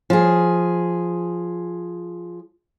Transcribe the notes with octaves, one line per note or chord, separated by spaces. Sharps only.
F3 G#4